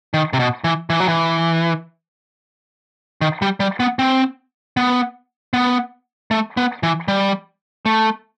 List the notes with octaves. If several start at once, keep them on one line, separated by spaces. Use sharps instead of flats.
D#3
C3
B2
E3
E3
F#3
E3
D#3
G3
G3
B3
C4
B3
B3
A3
B3
E3
G3
A3